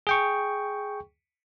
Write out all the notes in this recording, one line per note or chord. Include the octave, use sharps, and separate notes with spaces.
G#4 G5 C#6